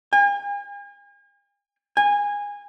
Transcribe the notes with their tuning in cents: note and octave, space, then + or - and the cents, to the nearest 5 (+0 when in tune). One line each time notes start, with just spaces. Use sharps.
G#5 -40
G#5 -20